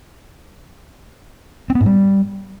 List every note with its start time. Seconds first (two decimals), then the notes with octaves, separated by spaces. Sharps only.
1.70 C4
1.75 B3
1.81 G#2
1.86 G3